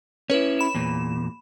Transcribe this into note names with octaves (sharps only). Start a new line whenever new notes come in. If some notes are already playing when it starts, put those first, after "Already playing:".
C#4 E4 B4 C#5
B5 E7
E2 A#2